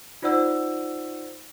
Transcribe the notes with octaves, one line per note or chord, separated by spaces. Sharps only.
D#4 F4 C5 D5 F#5 E6